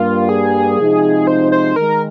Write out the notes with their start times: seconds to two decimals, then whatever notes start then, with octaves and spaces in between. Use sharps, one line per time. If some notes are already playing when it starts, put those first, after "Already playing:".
Already playing: G2 G3 A#3 F4
0.29 G#4
0.78 C3 F3 G#3 C4 D#4
1.27 C5
1.52 C5
1.76 D#3 G#3 D#4 A#4